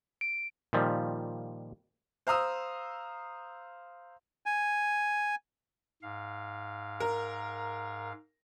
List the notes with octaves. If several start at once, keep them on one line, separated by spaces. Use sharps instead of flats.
D7
A#2 D#3 F3 G3
C5 F5 A#5 D#6 E6
G#5
G#2 F5
A#4